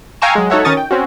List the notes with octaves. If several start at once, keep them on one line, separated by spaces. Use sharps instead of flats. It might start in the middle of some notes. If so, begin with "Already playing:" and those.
F5 G5 G#5 A#5 C#6 E6
F#3 G#3
D#4 F#4 A4 C#5 E5 F#5
D#3 C#4 A#4 C#6 D#6 A6
G5
C4 C#4 F#4